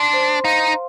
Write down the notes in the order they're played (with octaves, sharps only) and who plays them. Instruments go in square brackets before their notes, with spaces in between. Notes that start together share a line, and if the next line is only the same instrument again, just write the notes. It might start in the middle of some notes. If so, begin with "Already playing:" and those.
Already playing: [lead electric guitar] D4 [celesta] C6
[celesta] C5
[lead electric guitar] D#4 [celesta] F5